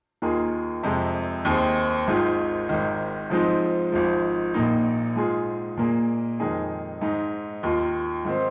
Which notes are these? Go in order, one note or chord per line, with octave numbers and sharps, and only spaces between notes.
D#2 D#3 A#3 F4 G#4
F2 C3 G#3
D#2 D#3 C4 G#4
G#1 G#2 G#3 F4
G#1 G#2 D#3
G#2 F3 G#3 C4 D#4
G#1 G#2 F3
A#1 A#2 A#3 D#4
G#2 G#3 F4 G#4
A#2 A#3 G#4
F2 D#3 G#3 D#4 G#4
G#2 G#3 D#4 G#4
D#2 D#3 A#3 F4
G#2 D#3 C4